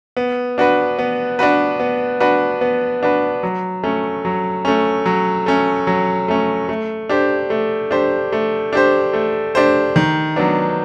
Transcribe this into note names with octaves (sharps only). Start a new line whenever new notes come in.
B3
D4 F#4 B4
B3
D4 F#4 B4
B3
D4 F#4 B4
B3
D4 F#4 B4
F#3
A3 C#4
F#3
A3 C#4
F#3
A3 C#4
F#3
A3 C#4
A3
D4 G4 C5
A3
D4 G4 C5
A3
D4 G4 C5
A3
D4 G4 C5
D#3
F#3 B3 D4